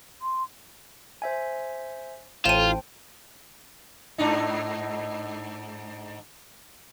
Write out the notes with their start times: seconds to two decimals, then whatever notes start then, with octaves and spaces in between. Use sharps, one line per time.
0.22 C6
1.22 C5 E5 G#5
2.46 A1 F4 C5 G5 A5 D#7 E7
4.18 G#2 D4 D#4